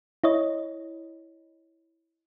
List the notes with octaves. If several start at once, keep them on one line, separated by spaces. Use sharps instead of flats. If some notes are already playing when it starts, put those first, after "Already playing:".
E4 C#5 D#5